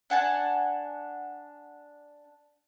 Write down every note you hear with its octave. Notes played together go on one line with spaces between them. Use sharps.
D4 F#5 G#5 A5